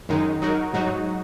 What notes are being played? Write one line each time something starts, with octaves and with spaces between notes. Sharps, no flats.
F#2 D#3 G#3 D#4
F#3 D#4 F#4 A#4
G#2 F#3 D#4 F#4